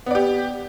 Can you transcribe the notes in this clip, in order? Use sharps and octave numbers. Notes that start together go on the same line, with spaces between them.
B3 G4 D5